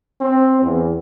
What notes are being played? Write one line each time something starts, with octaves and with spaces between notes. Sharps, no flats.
C4
E2